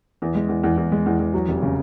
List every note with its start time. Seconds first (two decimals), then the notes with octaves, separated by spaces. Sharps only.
0.22 E2
0.35 G#3
0.49 E2
0.63 E2
0.77 E2
0.92 G#3
1.06 E2
1.19 E2
1.34 F#3
1.48 F1
1.62 C#3